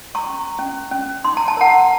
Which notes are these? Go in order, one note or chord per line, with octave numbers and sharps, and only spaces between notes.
A#5 C#6
C#4
C#4
C#4
D#4 C6
A#5
A5
A#4 F#5 A#5